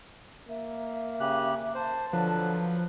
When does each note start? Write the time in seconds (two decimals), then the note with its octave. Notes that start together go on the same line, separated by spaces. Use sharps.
0.48 A#3 E5
1.20 C#3 G4 F#6
1.75 C5 A5
2.13 D3 F3 F#3 B4